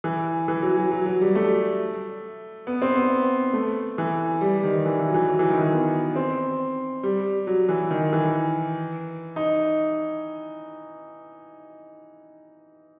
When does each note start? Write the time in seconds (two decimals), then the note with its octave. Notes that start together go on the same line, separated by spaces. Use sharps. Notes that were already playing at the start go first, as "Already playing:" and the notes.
0.04 E3
0.48 E3
0.62 F#3
0.77 F#3
0.91 F#3
1.06 F#3
1.21 G3
1.35 A3
2.67 B3
2.82 C4
2.96 B3
3.53 A3
3.98 E3
4.41 G3
4.64 D#3
4.85 E3
4.99 E3
5.09 F#3
5.14 E3
5.29 F#3
5.39 E3
5.50 D#3
5.61 E3
5.73 B3
6.16 C4
7.03 G3
7.47 F#3
7.69 E3
7.91 D#3
8.13 E3
9.36 D#4